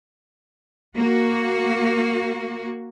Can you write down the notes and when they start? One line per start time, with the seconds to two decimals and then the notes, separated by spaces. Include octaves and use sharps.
0.98 A#3 F#4